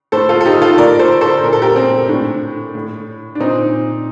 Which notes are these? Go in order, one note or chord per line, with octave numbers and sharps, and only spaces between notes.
A2 A4 C5
F4 A4
A4
D#4 G4
F4 A4
A2 A#4 D5
A4 C5
A4 C5
A#2 A#4
A4
G4 A#4
C4
A2 D4
A2
D4
A#2 C4 D#4